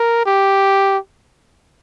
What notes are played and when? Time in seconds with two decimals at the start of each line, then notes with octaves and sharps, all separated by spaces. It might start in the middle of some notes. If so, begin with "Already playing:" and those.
Already playing: A#4
0.26 G4